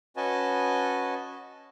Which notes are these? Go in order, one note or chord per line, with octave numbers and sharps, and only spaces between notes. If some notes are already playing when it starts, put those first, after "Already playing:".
C#4 F#4 B4 D#5 G#5 A5